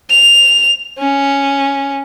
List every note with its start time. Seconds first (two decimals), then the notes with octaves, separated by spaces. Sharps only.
0.10 F7
0.99 C#4